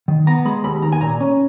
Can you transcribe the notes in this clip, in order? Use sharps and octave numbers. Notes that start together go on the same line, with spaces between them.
D#3
B3 A#5
G#3 B5
D#2 B5
D#3 A#5
G#5
A#2 A#5
C#4